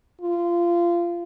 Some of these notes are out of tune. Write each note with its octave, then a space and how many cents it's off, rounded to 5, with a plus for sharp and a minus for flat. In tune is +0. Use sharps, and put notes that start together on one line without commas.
F4 -20